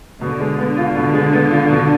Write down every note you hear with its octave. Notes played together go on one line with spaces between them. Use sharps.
B2 D3
G#3
B3
F4
B2
G#3
B3
F4
B2